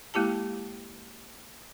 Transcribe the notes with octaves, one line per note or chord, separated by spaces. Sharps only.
G#3 A#3 E4 G4 A5